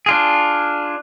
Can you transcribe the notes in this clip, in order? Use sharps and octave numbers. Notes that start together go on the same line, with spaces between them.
D4 F4 G#4